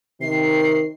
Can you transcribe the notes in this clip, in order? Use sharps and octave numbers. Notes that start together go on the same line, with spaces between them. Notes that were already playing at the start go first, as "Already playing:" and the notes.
C3 D#3 C7